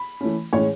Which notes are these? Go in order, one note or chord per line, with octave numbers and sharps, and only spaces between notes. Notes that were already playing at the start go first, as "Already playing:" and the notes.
Already playing: B5
E3 A3 C#4
A2 E3 G#3 C#4 C#5